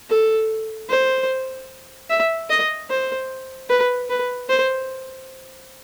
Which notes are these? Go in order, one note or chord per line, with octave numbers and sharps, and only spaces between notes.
A4
C5
E5
D#5
C5
B4
B4
C5